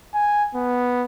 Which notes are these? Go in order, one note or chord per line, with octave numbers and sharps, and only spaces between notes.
G#5
B3